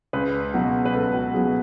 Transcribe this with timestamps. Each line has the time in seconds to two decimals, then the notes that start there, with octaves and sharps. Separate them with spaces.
0.13 C#2 B4
0.54 B2 F#3 F#4
0.85 B4
0.94 C#2 A4
1.14 F#4
1.34 B2 F#3 G#4